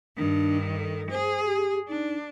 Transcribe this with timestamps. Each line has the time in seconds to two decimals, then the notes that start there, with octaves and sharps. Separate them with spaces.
0.17 G2 D#3 D4
0.75 A4
1.11 G#4 C5
1.45 G4
1.88 D4 D#4